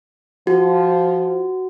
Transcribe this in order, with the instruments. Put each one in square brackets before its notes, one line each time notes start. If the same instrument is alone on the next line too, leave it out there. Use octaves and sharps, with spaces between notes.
[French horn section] F3 [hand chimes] F#4